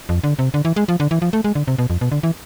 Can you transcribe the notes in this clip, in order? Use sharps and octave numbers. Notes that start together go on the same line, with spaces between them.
F2
D3
C3
D3
E3
G#3
F3
D3
E3
F3
A3
G#3
D3
C3
B2
F2
B2
D3
E3